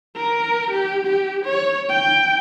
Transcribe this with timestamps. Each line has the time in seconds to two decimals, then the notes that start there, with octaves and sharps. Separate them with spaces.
0.16 A#4
0.71 G4
1.05 G4
1.45 C#5
1.89 G5